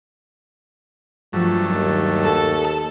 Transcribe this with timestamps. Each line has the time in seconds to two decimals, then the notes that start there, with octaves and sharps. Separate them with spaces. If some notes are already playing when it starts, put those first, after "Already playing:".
1.33 G2 F3 F#3 A3
1.71 D#2
2.24 A4